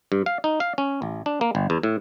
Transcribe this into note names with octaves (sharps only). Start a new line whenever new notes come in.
G2
F5
D#4
F5
C#4
A1
D4
A#3
G1
E2
A2